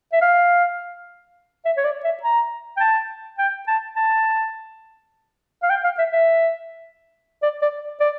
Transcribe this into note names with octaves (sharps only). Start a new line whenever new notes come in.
E5
F5
E5
C#5
D5
E5
A#5
G5
A5
G5
A5
A5
F5
G5
F5
E5
E5
D5
D5
D5